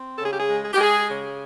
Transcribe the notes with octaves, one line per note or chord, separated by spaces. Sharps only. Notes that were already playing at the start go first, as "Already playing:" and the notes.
Already playing: C4
C#3 A4
G#4
G4
G#4
G#3
G#4
G4
G#3 G#4
C#3